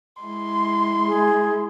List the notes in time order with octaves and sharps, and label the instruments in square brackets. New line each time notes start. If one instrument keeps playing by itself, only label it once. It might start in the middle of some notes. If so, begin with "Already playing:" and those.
[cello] G#3 E4 [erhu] C6
[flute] G#4